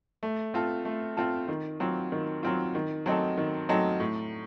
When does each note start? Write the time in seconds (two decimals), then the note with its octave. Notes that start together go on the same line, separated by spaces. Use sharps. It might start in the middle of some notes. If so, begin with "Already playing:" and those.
0.23 A3
0.54 C4 F4 A4
0.85 A3
1.17 C4 F4 A4
1.48 D#3
1.80 F#3 C4 F4
2.12 D#3
2.43 F#3 C4 F4
2.75 D#3
3.06 F#3 C4 D#4 A4
3.38 D#3
3.69 F#3 C4 D#4 A4
4.00 A2